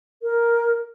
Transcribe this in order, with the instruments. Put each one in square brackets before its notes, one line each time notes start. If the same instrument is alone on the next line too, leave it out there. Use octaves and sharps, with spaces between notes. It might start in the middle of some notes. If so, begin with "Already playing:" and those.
[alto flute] A#4